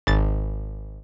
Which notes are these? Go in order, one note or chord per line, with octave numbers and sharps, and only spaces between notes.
G#1 A6